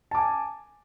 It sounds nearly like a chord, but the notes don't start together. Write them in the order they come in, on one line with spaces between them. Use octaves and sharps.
A5 D6 G#5